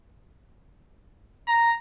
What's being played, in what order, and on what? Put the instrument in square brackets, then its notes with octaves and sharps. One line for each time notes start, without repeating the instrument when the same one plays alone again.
[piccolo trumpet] A#5